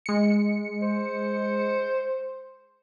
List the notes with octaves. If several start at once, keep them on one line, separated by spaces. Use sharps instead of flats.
G#3 C#7
C5